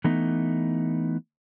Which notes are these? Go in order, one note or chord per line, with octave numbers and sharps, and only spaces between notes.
E3 A3 B3 D#4